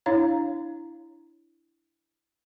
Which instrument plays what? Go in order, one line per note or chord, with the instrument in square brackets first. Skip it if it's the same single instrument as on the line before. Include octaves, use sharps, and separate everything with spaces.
[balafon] D4 E4 C#5 F5 A#5